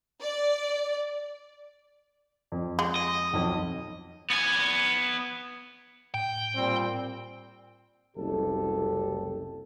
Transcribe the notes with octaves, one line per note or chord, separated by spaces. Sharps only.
D5
F2
G#3
D#5
B1 F2
B3 G#5
A2 G5
A#2 G3 C4
F#1 C2 G4 A4